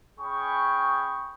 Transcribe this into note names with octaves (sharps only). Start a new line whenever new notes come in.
C#4 G#4 G5 B5 C#6